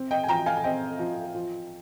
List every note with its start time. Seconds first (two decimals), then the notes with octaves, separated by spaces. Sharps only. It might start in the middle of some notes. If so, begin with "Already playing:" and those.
Already playing: C4
0.11 D#5 G5
0.24 G#5
0.28 F3 G5 A#5
0.46 F5 G#5
0.57 G#5
0.64 C4 D#5 G5
0.99 F3
1.35 F3